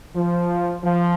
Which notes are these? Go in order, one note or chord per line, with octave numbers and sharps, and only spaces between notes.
F3
F3